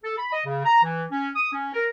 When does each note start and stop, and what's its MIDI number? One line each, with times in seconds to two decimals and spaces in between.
0.04 0.14 69
0.18 0.32 83
0.32 0.42 75
0.46 0.65 49
0.65 0.82 82
0.84 1.04 52
1.11 1.30 61
1.35 1.51 87
1.53 1.71 61
1.74 1.87 70